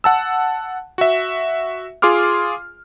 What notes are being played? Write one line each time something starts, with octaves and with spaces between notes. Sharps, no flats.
F#5 A5 E6
F#4 E5
F4 G#4 C6 D6 F6